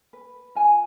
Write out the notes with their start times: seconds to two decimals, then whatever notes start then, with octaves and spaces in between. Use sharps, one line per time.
0.13 B4
0.55 F4 G#5